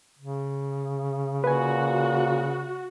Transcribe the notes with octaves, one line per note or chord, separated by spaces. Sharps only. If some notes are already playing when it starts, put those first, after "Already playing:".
C#3
A#2 F#4 B4 G#5